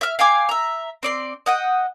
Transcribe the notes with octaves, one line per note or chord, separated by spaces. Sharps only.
E5 F6
F5 G5 G#5 D6
E5 A#5
C4 D5 C6
D#5 F#5 G5